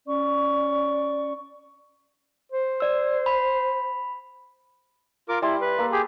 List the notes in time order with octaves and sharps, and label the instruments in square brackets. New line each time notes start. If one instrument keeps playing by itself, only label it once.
[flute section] C#4 D5 C#6
[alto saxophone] C5
[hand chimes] D5 E6
B5
[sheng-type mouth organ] F4 A#4 D6
[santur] G3 A5 C6 [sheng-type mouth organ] E4
[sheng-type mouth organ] B4
[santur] A#3 A4 A#4
[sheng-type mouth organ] G4 G#4